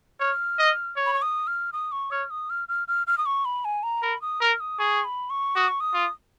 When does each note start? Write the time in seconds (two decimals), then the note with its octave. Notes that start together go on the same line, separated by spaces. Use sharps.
0.20 C#5 F6
0.59 D#5
0.96 C#5
1.06 B5
1.14 C#6
1.22 D#6
1.47 F6
1.73 D#6
1.92 C#6
2.11 C#5 F6
2.30 D#6
2.50 F6
2.69 F6
2.88 F6
3.07 F6
3.18 D#6
3.26 C#6
3.45 B5
3.65 G#5
3.83 A#5
4.02 A#4 B5
4.22 D#6
4.41 A#4 F6
4.60 D#6
4.79 G#4 C#6
5.04 B5
5.30 C#6
5.56 F#4 D#6
5.68 C#6
5.80 D#6
5.94 F4